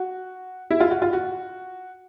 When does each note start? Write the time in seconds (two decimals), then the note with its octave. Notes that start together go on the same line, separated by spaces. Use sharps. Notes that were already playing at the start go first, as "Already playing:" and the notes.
Already playing: F#4
0.71 E4
0.80 F4
0.91 F#4
1.02 F4
1.13 F#4